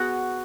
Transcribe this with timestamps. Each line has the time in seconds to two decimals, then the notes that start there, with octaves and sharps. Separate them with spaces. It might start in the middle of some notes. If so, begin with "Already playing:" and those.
Already playing: B3 F#4 G#4